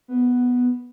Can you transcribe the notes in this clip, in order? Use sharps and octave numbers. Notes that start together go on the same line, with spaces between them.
B3